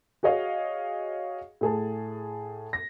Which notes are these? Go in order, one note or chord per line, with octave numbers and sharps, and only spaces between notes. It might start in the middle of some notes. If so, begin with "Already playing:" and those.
F#4 G#4 C#5 D#5 F5
A2 G#4 A5
A#6